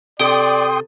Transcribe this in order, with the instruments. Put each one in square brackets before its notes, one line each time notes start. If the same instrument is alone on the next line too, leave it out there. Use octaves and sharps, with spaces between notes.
[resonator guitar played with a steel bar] C3 A4 D#5 [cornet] D5 [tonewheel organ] G5 C6 D#6